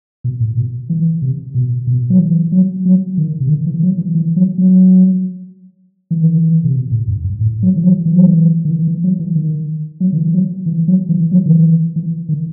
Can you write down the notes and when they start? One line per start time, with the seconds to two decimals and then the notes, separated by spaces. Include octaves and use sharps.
0.24 B2
0.40 A2
0.57 B2
0.90 E3
1.22 C3
1.55 B2
1.87 B2
2.10 F#3
2.19 E3
2.52 F#3
2.85 F#3
3.18 D#3
3.40 C3
3.49 D#3
3.66 E3
3.83 F#3
3.98 E3
4.15 E3
4.36 F#3
4.58 F#3
6.11 E3
6.23 D#3
6.37 E3
6.64 C3
6.76 B2
6.91 A2
7.07 F#2
7.24 G2
7.41 A2
7.63 F#3
7.76 E3
7.83 F#3
8.06 E3
8.16 F#3
8.27 E3
8.65 D#3
8.71 E3
8.87 E3
9.04 F#3
9.20 E3
9.36 D#3
10.00 F#3
10.13 D#3
10.17 E3
10.34 F#3
10.66 E3
10.88 F#3
11.09 E3
11.32 F#3
11.38 E3
11.46 D#3
11.53 E3
11.96 E3
12.29 D#3